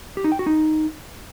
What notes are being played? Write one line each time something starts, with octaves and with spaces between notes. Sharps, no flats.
G4
D#4
G5
F#4
D#4